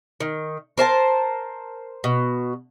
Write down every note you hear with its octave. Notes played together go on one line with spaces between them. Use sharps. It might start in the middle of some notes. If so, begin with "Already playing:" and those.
D#3
A#4 C5 G#5 A5
B2